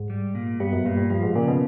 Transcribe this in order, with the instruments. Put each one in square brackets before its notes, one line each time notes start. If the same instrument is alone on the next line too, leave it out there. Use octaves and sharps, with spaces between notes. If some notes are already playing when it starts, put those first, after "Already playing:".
Already playing: [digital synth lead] G#2
[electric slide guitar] G3
A#2
[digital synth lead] G2 [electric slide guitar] B3
[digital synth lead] F#2
[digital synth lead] G2 [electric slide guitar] A#2
[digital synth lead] G2
[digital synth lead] G2 [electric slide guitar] F3
[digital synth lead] G#2
[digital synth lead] A#2 [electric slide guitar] C#3
[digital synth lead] B2